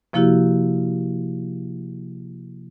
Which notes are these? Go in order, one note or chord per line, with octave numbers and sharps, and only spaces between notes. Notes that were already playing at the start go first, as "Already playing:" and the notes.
C3 F3 A#3 E4 F#4 G4